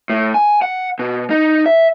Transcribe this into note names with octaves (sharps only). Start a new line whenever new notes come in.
A2
G#5
F#5
B2
D#4
E5